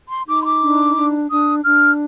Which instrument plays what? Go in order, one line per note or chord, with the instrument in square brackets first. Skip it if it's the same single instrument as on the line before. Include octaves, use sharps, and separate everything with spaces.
[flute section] C6
D#4 D6
C6
D6
D4
D4
D4 D#6
D4 F6